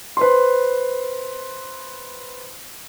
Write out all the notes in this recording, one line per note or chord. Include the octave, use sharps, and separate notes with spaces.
B4 C5 C6